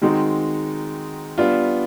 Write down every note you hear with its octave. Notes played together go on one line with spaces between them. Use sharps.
D#3 G#3 C4 D#4 F#4
G3 B3 D4 F4